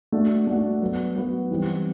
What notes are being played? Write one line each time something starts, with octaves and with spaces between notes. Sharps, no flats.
A3 D4 F#4
A3 D4 F#4
F#3 B3 F#4
F#3 B3 F#4
E3 G3 C4